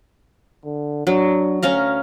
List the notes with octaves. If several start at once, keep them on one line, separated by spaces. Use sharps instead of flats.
D3
F#3 D4
D2 C#4 F5 A#5